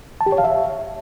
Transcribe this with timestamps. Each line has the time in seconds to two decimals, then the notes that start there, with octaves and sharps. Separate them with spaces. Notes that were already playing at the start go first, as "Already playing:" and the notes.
0.21 A5
0.26 G4
0.32 C#5
0.38 F5
0.44 E5